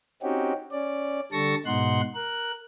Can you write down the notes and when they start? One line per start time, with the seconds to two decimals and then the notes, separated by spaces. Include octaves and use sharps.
0.22 C4 C#4 D#4 F#4 G4
0.71 C#4 D5
1.32 D3 G3 A4 A5 C#6 A#6
1.66 G#2 B2 D#4 F#5 C6 F#6
2.15 A#4 F#6